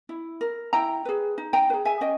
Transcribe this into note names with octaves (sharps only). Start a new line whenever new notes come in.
E4
A#4
E4 G5 A#5
G#4 B4
D#4
G5 A#5
B4
G#4
E5 G#5
C#4 D#5 G5